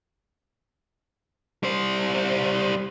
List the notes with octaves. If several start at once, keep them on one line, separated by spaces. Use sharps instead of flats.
G3 C5